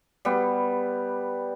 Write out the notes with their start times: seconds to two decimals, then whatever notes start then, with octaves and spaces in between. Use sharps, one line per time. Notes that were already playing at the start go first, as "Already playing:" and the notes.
0.25 G3 B3